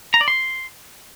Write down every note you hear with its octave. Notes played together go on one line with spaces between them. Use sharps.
A#5
D5
C6